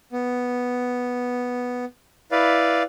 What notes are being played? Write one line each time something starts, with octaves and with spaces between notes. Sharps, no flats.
B3
E4 B4 D5 F5